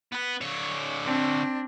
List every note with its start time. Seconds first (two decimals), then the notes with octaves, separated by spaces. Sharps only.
0.12 B3 B4
0.41 D3 C#5
1.04 C4 D4